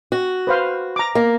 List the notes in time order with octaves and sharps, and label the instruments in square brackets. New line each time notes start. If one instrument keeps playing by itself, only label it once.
[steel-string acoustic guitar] F#4
[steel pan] B4 C5 F5
A#5 D6
[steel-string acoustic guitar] A#3